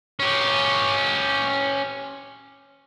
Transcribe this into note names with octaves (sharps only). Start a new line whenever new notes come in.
C#4 G4